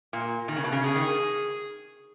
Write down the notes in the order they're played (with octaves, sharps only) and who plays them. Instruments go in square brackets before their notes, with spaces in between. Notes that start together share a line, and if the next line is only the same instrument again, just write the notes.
[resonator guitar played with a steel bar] A#2
D#3
C#3
B2
C#3
[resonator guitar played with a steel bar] C#3 [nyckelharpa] G#4
[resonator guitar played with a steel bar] D#3